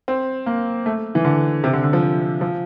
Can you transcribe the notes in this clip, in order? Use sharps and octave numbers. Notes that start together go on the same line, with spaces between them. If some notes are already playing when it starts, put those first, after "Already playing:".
C4
A#3
A3
E3
D3
C3
D3
D3
F3
F3